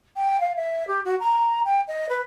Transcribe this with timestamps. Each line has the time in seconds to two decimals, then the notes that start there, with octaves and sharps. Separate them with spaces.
0.16 G5
0.40 F5
0.56 E5
0.87 G4
1.05 F#4
1.20 A#5
1.65 G5
1.87 D#5
2.09 B4